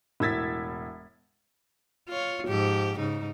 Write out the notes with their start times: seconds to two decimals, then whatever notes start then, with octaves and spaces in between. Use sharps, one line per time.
0.20 E1 A2 E6 G#6 A6 B6
2.09 F4 C#5
2.47 G#2 F3 G4
2.98 G#2 C#3 D#4